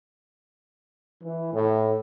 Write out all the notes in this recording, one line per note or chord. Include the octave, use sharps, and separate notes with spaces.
E3
A2